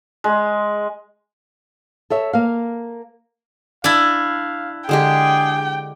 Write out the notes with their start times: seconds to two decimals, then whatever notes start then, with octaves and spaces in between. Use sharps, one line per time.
0.24 G#3
2.10 A4 C#5 E5
2.33 A#3 F5
3.84 D4 E4 F5 G#5
4.89 D3 G#3 G4 G#4 G5